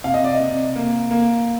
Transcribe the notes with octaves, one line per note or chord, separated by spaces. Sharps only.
C3 F5
D#5
D5
D#5
C3
A#3
A#3